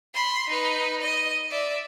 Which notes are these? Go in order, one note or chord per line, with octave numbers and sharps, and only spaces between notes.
B5 C6
D#4 B4
D#5
D5 E5